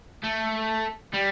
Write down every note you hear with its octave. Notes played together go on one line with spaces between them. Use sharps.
A3
G3